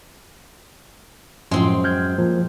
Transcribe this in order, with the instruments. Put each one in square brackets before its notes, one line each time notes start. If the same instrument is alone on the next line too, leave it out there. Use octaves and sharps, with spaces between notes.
[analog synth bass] F#2 [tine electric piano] A2 F3 [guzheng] G#3 C4 G5
[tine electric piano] F6 G6 G#6
[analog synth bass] A#2 [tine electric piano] F3